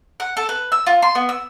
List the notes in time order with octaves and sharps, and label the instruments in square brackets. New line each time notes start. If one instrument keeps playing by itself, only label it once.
[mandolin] F#5
A4
B4
E6
F4
C6
B3
E6